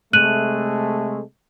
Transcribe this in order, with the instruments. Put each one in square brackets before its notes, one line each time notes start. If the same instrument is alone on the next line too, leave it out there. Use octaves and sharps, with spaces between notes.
[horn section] C3 G#3 A3 [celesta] F#6 D#7 F#7